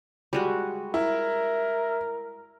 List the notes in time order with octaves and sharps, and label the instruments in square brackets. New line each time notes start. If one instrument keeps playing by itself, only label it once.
[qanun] G3 G#3 F#4
[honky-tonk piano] E4 [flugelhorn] A#4